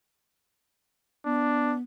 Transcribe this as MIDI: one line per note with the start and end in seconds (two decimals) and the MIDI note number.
1.25 1.82 59
1.25 1.75 62